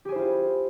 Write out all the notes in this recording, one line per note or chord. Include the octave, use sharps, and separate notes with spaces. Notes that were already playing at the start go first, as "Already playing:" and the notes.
E4 F4 G4 G#4 C5